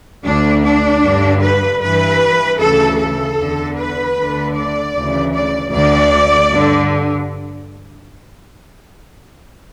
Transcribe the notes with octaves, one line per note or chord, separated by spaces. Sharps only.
D2 D3 D4
D4
G2 D3
B4
G2 E3 B4
D2 C#3 E3 A4
A4
E2 D3
B4
D2 D3
D5
D2 C#3 E3
D5
D2 D3 D5
G2 D3